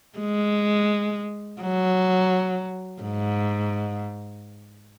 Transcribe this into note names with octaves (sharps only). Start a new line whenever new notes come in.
G#3
F#3
G#2